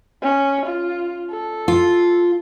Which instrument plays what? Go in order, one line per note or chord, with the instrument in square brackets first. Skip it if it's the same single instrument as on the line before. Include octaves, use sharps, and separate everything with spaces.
[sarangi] C#4
F4
A4
[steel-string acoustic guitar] F4